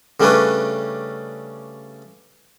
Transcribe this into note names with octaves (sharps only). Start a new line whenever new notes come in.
C#3 G3 A3 C#4 D4 B4